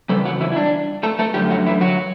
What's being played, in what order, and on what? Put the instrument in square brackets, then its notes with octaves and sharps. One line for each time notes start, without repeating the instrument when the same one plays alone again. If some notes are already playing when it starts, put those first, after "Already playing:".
[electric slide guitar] E2 C#3 G3 A4
F#3 F#4
E3 E4
E4
D4
A3 A4
A3 A4
F#2 D3 G3 A3 G4
F#3 F#4
E3 E4
F#3 F#4